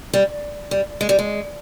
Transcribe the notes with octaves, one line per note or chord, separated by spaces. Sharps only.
G3
G3
G#3
G3
G#3